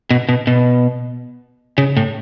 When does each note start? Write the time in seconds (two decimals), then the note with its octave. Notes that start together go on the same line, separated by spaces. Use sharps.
0.11 B2
0.29 B2
0.47 B2
1.78 C#3
1.97 A2